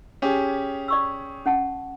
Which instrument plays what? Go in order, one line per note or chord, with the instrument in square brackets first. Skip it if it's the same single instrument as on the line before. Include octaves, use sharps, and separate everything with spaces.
[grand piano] C#4 G4 G#4
[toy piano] D5 C#6 E6
C#4 F#5 A5